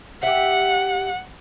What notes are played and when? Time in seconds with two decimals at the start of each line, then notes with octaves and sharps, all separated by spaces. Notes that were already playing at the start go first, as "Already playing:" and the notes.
0.23 G4 E5 F#5